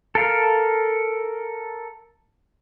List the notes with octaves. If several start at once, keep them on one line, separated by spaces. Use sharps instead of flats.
A4 A#4 F5